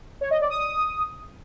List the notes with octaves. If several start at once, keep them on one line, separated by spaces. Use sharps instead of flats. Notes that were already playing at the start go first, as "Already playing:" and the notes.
C#5
D#5
D5
D#6